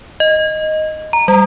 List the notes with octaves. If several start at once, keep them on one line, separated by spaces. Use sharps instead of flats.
D#5
A#5
G3